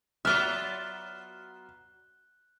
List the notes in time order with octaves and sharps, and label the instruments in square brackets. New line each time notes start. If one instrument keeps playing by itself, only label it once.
[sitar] F#3 B3 F4 [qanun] D5 E5 [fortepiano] F6 [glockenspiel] F#6 G7